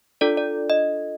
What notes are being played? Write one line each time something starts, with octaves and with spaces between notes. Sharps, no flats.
D4 F4 A4 D5
D5
D#5